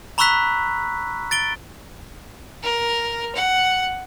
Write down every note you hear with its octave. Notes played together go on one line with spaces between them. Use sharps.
A#5 B5 C#6 E6 F#6 B6
A6 D7 G7
A#4
F#5